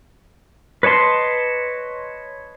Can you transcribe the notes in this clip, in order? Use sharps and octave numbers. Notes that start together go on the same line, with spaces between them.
B4 C#5 D#5 A5 C6